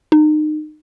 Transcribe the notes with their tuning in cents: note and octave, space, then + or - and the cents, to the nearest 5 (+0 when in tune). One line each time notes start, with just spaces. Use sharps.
D#4 -30